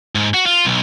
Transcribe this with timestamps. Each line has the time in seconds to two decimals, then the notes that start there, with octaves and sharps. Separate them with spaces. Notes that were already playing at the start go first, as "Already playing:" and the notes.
0.15 G#2
0.34 F#4
0.46 F4
0.65 B1